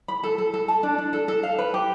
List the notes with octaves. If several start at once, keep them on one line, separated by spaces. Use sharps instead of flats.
B5
A4
A4
A4
A5
D4
D4
A4
A4
F5
B4
G4